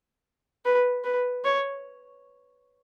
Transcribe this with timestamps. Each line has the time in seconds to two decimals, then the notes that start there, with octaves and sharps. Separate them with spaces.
0.65 B4
1.04 B4
1.45 C#5